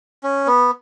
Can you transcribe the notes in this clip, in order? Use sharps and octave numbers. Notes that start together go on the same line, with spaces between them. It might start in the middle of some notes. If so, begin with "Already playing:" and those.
C#4
B3